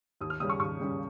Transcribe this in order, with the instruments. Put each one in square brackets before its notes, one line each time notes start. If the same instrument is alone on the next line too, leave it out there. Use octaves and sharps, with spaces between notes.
[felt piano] D#2 D#6
F6
C#3 G3 C#4 D#6
C#6
D#2 C#6
C#3 G3 C#4